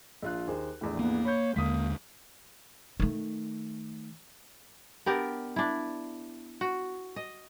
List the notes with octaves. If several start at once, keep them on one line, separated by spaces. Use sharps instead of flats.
A#1 F4 F#6
D#2 G#4 C5
A#1 E2 A2
A#3 B3
C#5 B5 G6
D#2 D3 G#3 A#3 D#6 B6
D#3 A3
B3 D4 G4 A#4
D4 E4
F#4
D#5